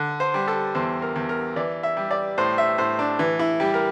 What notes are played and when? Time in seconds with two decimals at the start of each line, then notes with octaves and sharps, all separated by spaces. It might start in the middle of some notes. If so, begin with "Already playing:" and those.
Already playing: D3
0.20 C5
0.34 G3
0.48 A4
0.75 E2 C5
1.02 A#4
1.16 E2
1.29 A#4
1.56 E3 D5
1.83 E5
1.97 G3
2.11 D5
2.38 A2 C5
2.58 E5
2.78 A2 C5
2.99 D4
3.19 E3
3.39 E4
3.60 G3 G4
3.74 A#4